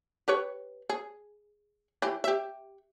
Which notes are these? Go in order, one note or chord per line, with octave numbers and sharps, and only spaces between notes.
G4 B4 C#5
G#4
E3 G4
G4 E5